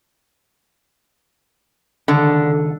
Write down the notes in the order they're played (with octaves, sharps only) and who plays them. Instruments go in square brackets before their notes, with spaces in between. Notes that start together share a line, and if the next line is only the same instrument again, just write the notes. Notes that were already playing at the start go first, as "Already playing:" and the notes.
[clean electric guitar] C#2 D#3 A4 [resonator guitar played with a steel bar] D3